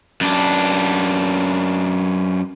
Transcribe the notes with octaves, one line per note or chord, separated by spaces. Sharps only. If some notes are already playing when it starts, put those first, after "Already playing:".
F#2 D4